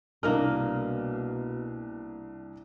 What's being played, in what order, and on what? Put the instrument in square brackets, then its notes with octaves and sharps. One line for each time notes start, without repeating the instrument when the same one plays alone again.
[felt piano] C2 D4 F6 [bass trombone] B2 [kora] A#3 A#4 D#5